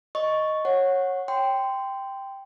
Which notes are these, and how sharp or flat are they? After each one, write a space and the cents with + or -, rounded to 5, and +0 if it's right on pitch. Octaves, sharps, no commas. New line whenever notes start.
D#5 +0 C#6 +0
C#5 -15 F#5 -10
G5 +0 C6 -15